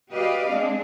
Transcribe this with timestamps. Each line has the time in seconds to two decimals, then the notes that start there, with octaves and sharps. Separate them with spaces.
0.10 F#4 G4 B4 D5 D#5 F5
0.48 G#3 C4 D4